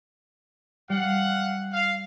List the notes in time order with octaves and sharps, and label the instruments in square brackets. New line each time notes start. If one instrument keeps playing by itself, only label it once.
[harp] G3 [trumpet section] F5 F#5
[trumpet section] F5